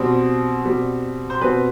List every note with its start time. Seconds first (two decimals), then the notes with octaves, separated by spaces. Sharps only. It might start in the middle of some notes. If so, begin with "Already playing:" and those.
Already playing: B2 G3 C4
0.65 B2 G3 C4
1.30 C5
1.41 B2 G3 C4 B4